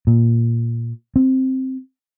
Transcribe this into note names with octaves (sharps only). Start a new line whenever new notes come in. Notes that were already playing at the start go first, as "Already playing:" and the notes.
A#2
C4